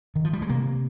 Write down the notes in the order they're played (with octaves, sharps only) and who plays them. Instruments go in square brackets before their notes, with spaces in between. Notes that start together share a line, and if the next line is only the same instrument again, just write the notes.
[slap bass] D#3
F3
G3
G#3
[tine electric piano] C3 [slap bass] A#3